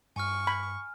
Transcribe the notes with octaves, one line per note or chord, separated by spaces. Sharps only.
G2 G#5 C#6 F6
B5